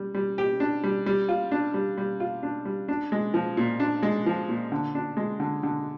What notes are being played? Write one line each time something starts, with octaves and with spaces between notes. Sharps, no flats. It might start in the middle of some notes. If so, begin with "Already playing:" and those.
Already playing: G3
G3
G4
D4
G3
G3
F4
D4
G3
G3
F4
D4
G3
D4
G#3
F3
A#2
D4
G#3
F3
A#2
D3
D4
G#3
D3
D3